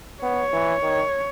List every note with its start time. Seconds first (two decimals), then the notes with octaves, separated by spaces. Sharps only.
0.22 B3 C#5
0.53 E3
0.83 D#3